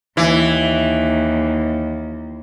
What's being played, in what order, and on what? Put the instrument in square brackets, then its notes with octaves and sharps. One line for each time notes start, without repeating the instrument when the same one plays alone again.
[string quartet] D#2 [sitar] E3